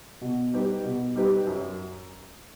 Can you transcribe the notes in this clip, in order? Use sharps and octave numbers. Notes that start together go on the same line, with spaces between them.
B2
G3 D#4 G4 B4
B2
G3 D#4 G4 B4
F#2